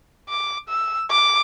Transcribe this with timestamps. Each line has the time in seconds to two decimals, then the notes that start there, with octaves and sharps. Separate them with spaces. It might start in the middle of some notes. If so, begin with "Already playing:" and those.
0.29 D6
0.69 E6
1.11 D6